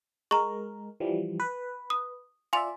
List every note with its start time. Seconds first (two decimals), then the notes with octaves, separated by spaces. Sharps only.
0.31 G#3 A#4 A#5 C#6
1.00 E3 F3 G3
1.40 B4
1.90 D#6
2.53 F4 D5 E5 G#5 C6 F7